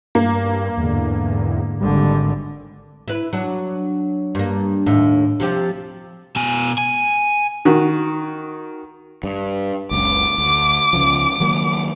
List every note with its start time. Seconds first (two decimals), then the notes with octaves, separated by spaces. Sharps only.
0.15 G2 A#3
0.77 E2 G#2 D3
1.81 G#1 D3 G3
3.08 E4 B4
3.33 F#3 D4
4.35 G2 A#3
4.86 D#2 A2
5.40 C3 F3 G4
6.36 B2 G#5
6.78 G#5
7.65 D#3 F#4
9.24 G2
9.91 F#1 C#2 D6
10.38 D2
10.93 C#2 C#3 F3
11.40 D#3 F#3 A#3